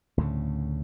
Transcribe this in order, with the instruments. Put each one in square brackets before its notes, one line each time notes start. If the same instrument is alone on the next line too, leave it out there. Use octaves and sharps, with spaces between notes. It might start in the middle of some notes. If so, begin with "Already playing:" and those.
[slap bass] D2 A2 C#3